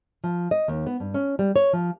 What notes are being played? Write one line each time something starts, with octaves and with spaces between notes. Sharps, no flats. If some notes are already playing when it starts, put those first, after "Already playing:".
F3
D#5
D#2
B3
G2
C#4
G3
C#5
F3